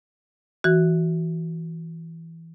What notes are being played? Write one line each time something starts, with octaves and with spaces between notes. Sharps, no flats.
E3 F#4